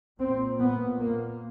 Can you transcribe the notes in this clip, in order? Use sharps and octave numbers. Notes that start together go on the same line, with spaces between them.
A#2 C4
B3
A#3